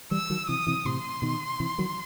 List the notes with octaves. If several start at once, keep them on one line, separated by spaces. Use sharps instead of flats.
E3 G3 E6
D#3 F#3
C3 E3 D#6
C3 E3
A2 C3 C6
B2 D#3
C3 E3
D#3 F#3